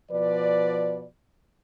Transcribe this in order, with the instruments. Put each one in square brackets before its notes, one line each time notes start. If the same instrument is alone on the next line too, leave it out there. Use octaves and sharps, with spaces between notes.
[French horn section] B2 F3 B4 D5